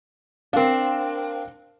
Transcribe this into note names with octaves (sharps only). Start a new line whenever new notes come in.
C4 D4 A#4 F5